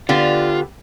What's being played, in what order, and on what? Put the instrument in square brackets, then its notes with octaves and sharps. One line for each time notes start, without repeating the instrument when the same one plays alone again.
[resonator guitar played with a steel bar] D3 B3 G4 [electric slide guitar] F4